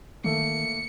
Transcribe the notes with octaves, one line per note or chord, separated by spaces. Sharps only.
D#3 A3 A#3 C#7